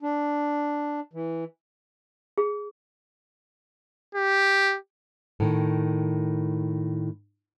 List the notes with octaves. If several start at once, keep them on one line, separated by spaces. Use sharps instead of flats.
D4
E3
G#4
G4
A2 D#3